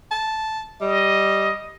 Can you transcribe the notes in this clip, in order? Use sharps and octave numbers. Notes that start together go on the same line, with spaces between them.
A5
G3 D#5